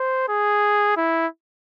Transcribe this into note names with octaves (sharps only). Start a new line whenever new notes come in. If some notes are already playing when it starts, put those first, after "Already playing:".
Already playing: C5
G#4
E4